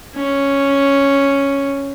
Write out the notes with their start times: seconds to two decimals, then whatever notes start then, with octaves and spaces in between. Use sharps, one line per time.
0.16 C#4